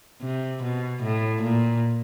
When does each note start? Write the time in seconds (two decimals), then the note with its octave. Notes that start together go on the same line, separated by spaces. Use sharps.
0.22 C3
0.63 B2
1.03 A2
1.42 A#2